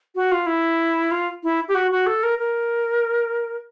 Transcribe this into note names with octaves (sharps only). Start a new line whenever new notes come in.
F#4
F4
E4
F4
E4
G4
F#4
F#4
A4
A#4
A#4